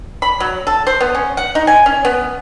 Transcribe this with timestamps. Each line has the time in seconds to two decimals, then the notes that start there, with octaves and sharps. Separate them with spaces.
0.22 B5
0.40 F#3
0.67 A4
0.87 C5
1.00 B3
1.15 C#4
1.37 F#5
1.55 D#4
1.67 G#5
1.86 C#4
2.05 B3